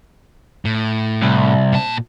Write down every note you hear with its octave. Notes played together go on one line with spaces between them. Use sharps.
A2
C2
A#2 A5